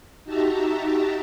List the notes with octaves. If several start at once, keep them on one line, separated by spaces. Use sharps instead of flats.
D#4 F#4 G4 E5 A5 A#5